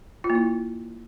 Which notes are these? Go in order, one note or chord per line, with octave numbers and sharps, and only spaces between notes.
F4
A#3
E4